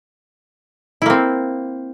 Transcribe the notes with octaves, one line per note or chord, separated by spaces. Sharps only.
A#3 C4 E4